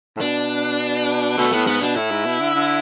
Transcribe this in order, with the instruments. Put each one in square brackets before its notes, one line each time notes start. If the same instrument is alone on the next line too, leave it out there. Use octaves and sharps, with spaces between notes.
[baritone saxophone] A2
[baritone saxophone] B2 [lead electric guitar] D4
[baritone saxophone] B2 [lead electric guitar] A3
[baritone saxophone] A2 [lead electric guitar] B3
[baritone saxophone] G#2 [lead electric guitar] B3
[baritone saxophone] B2 [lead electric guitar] D4
[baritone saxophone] A2 [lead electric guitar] E4
[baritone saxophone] G#2
B2
D3
D3